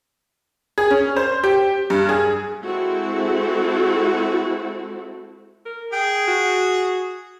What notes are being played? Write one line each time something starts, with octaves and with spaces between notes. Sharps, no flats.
G#4
C#4
C5
G4
G2
G#4
G#3 C4 E4 F#4 A4
A#4
G#4 G5
F#4